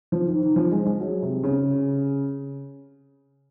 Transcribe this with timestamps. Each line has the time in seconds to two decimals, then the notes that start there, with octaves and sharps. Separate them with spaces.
0.12 F3
0.26 D#3
0.42 D#3
0.56 F3
0.71 G#3
0.85 G#3
1.00 F#3
1.22 C3
1.44 C#3